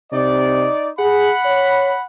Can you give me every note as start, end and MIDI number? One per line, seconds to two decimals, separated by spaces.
0.12 0.66 48
0.12 0.89 63
0.12 0.89 74
0.99 1.32 68
0.99 2.04 78
0.99 2.04 83
1.45 1.93 73